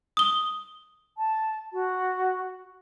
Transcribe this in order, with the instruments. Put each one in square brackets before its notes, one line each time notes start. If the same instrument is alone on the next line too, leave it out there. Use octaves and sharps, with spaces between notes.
[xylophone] D#6 G7
[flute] A5
F#4